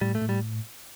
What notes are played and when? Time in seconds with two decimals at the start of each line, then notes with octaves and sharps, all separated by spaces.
0.01 A2 G3
0.15 A3
0.22 A2
0.29 G3